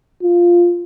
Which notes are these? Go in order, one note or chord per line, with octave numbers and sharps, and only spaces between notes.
F4